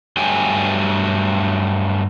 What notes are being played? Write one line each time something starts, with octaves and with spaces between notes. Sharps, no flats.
G2 F#3 A3 G4 G5 G#5